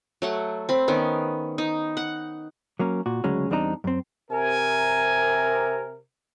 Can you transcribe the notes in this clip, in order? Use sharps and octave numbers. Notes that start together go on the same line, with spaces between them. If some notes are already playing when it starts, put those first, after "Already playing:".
F#3 A3 F#5
C4 B5
D#3 B3 C#4
D#4
F#5
F#3 A#3 C#4
A#2 F#4
D2 C#3 F#3 G#3 C#4
E2 G3 C4 D4 D#4 A#5
F#2 C4
C3 A#4 G#5